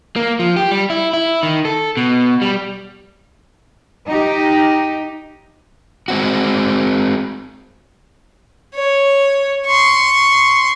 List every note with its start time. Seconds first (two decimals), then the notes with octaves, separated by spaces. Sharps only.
0.16 A#3
0.39 F3
0.56 G4
0.71 G3
0.90 E4
1.13 E4
1.43 D#3
1.65 A4
1.97 B2
2.41 G3
4.07 D#4 G4
6.08 G#3 C4 F#4
8.75 C#5
9.67 C6 C#6